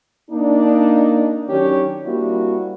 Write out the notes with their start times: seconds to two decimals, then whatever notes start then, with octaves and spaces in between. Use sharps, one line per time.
0.30 A#3 D4 D#4
1.47 D#3 F#3 C#4 D4 G4 C#5
2.04 G3 A#3 C4 D4 E4 F#4